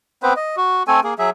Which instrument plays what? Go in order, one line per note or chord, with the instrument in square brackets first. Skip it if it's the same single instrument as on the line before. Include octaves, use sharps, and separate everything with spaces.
[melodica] B3 C4 B4 C5
D#5
F#4
A3 C4 A4 G#5
A#3 G#4
F#3 G#4 E5